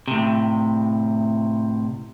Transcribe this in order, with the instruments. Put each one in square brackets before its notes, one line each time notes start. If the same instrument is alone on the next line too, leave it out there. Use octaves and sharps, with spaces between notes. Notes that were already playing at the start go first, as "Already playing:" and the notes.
[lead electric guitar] A2 C3